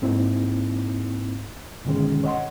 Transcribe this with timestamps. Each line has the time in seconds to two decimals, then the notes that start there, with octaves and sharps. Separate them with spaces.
0.02 G#2 A#3 C4 D#4 E4
1.85 G2 B2 D3 D#3 G#3 C#4
2.24 C#5 D#5 F#5 C6